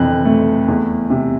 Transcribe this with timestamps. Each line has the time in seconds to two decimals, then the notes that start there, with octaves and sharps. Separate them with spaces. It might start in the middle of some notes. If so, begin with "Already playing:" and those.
Already playing: F2 E3 F#6
0.25 A3
0.68 E2
1.10 C3